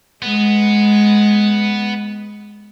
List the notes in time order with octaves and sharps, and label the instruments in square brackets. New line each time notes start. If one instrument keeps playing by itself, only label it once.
[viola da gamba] G#3 [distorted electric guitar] B3